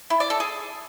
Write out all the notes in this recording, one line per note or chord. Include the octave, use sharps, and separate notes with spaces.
E4
D5
A4
G#4